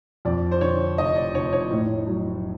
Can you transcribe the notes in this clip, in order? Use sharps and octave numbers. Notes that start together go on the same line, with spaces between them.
F2 D5
C5
D3 C#5
F1 D#5
D5
F1 C#5
C#5
A2
F#3